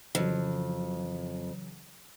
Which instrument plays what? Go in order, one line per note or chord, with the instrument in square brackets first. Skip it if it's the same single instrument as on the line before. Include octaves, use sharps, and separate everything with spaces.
[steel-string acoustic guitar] F2 [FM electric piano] C#3 E3 F#3